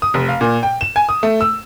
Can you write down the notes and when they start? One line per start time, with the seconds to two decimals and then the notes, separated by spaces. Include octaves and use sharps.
0.02 D#6
0.14 F1
0.29 F5
0.41 A#2
0.63 G5
0.81 E7
0.96 G#5
1.09 D#6
1.23 A3
1.41 E6